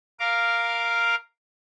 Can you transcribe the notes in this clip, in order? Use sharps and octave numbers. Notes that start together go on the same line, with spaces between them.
A#4 F5 D6